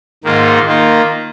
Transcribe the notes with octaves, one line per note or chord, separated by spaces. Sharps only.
G#2 D#3 A#3 F4
D#3 A#3 F4